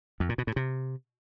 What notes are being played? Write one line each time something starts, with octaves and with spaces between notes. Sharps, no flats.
F2
A#2
B2
A2
C3